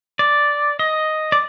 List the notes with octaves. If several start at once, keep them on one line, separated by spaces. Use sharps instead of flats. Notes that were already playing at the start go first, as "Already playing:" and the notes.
D5
D#5
D5